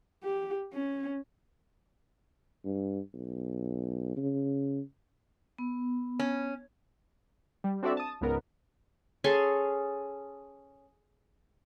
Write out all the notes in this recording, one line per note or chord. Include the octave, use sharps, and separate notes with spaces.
G4
C#4
G2
B1
C#3
B3
C#4
G3
C4 D4 F#4 A4 D5 E5
A5 D#6
C#2 G#2 C#3 B3 A#4
C#4 G#4 A4 C6